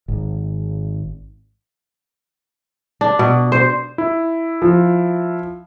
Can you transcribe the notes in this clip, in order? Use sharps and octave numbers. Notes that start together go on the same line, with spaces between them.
G#1
D4
B2
C5
E4
F3